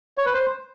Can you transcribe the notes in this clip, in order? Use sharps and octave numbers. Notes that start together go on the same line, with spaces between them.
C#5
B4
C5